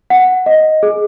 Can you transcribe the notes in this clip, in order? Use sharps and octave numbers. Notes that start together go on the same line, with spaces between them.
F#5
D#5
G#4